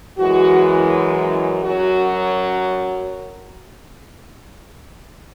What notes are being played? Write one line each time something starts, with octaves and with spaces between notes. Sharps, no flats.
F#2 E3 G#3 F#4
F#2 F#3 F#4